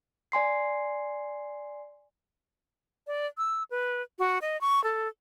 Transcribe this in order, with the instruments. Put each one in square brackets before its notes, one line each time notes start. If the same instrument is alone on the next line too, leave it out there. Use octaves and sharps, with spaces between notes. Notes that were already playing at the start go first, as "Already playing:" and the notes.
[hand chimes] D5 G#5 C6 C7
[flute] D5
E6
B4
F#4
D#5
C#6
A4